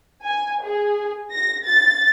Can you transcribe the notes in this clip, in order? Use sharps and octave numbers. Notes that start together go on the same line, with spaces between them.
G#5
G#4
A#6
A6